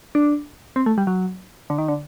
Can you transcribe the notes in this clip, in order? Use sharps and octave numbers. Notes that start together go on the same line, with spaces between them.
D4
C4
A3
G3
F#3
D3
D#3
D3